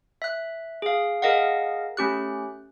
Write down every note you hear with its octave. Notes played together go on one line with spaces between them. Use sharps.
E5 F#6
G#4 F5
G#4 A#4 D#5 F5 F#5
A3 C#4 G4 F#6